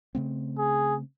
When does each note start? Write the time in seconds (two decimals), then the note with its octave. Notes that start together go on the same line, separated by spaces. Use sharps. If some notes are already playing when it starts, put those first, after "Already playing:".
0.15 C#3 A3 C4
0.58 G#4